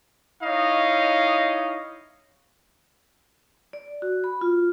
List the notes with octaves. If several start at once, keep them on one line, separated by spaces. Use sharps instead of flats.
D#4 E4 C#5 D#5 F5
D5
F#4
B5
F4